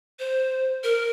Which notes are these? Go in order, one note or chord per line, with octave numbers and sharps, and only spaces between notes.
C5
A#4